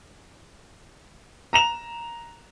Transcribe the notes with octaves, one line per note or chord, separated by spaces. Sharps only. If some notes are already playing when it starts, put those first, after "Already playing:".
A#5 E7 F7